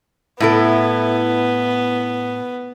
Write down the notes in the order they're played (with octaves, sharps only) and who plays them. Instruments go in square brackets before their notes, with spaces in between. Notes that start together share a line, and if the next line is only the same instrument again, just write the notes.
[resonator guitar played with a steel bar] A2 E4 A4 [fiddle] B3